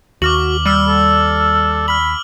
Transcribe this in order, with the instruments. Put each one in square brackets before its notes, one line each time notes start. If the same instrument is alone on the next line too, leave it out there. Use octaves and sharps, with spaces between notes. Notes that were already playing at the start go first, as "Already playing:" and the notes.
[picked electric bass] D#2 [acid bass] F#4 [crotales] D6 F6 F#7
[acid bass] G3 [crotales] E6 F6 F#7
[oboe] A4
[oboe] B5 [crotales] F6 F#7